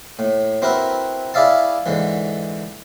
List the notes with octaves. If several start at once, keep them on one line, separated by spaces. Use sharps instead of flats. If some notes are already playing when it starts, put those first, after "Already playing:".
A2
C4 E4 F#4 A#4 B4
E4 G#4 D5 E5 F5 A5
G#2 D3 E3